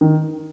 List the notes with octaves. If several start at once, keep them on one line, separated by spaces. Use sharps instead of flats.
D#3